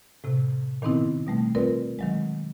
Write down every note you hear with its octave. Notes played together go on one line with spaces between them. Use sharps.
A2 C3
A#2 D#3 B3 C4 D#4 E4
B2 G3 A3
C4 F4 A#4 B4 D5
D#3 F#3 G#3